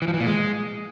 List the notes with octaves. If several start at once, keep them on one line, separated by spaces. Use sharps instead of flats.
E3
F3
E3
A#2
G#3